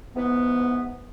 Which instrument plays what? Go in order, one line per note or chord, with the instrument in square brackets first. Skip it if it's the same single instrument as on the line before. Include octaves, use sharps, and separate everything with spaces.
[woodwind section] G#2 E3 B3